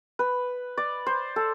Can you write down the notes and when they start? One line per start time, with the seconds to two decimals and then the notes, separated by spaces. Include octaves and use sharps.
0.19 B4
0.77 D5
1.06 C5
1.36 A4